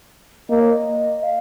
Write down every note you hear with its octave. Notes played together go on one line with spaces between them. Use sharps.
A#3 D#5
C#5
D#5
F5